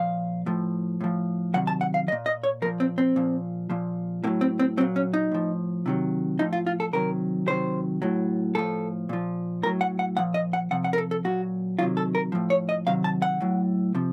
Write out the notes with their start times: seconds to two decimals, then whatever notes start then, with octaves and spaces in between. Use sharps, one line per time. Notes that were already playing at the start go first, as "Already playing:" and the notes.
Already playing: A#2 F3 F5
0.46 A2 F3
1.01 A2 F3
1.54 C3 D#3 F#3 F#5
1.67 A5
1.81 F#5
1.94 F5
2.07 F3 D#5
2.12 A#2
2.26 D#5
2.43 C#5
2.62 F3 A#4
2.66 A#2
2.80 C4
2.98 C4
3.16 A#2 F3
3.70 A#2 F3
4.24 A2 A#3
4.27 F#3
4.41 C4
4.59 C4
4.77 F#3 C4
4.81 A#2
4.96 C#4
5.14 D#4
5.32 A2 F3
5.86 C3 D#3 F#3
6.39 A2 F3 D#4
6.53 F4
6.67 F4
6.80 A4
6.93 C3 D#3 F#3 A#4
7.47 C3 D#3 F#3 C5
8.02 A2 F#3
8.55 A2 F3 A4
9.09 A#2 F3
9.63 A2 A#4
9.66 F#3
9.81 F#5
9.99 F#5
10.17 A#2 F3 F#5
10.34 D#5
10.53 F#5
10.71 C3 F3 F#5
10.84 F#5
10.93 A#4
10.98 A4
11.11 A4
11.24 A#2 F#3 F#4
11.79 C3 D#3 F#3 F4
11.97 A4
12.15 A#4
12.32 A2 F3
12.50 C#5
12.69 D#5
12.87 C3 D#3 F#3 F5
13.04 A5
13.22 F#5
13.41 A2 F#3
13.95 C3 F3